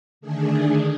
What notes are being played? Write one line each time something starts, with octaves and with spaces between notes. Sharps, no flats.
D3 D#3 A3 D4 G#4